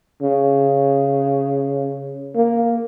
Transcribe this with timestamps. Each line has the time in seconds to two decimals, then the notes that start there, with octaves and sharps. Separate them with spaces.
0.22 C#3
2.35 A#3